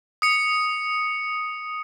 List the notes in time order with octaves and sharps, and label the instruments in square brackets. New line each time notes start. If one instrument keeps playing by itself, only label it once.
[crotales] D#6 C#7